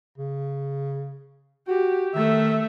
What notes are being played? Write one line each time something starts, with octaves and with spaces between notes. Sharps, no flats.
C#3
F#4 G4
D#3 A3 E5